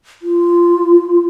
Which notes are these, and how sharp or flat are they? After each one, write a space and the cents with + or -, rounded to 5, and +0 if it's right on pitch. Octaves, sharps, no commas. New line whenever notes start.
F4 -15